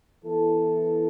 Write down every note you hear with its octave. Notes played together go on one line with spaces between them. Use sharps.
E3 B3 E4 A4